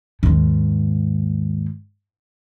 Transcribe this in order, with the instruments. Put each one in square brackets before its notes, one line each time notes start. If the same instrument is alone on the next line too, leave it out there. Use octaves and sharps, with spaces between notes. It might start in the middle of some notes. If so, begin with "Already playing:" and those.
[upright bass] D#2 G#2